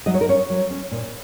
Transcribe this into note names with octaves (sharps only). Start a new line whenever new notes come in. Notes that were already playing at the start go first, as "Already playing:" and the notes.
F#3 D#5
C#5
A#4
C#4 C#5
F#3
C#4
A#2